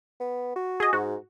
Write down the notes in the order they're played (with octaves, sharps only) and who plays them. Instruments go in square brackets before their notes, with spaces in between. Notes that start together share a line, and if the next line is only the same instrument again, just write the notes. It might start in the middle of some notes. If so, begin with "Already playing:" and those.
[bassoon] B3
F#4
[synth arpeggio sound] G#4 D#5
[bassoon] G#2 [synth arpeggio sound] F#4